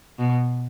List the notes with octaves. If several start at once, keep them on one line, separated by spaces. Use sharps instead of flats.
B2